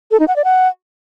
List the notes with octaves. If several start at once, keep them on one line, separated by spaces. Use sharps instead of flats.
A4
D#4
F#5
D5
F#5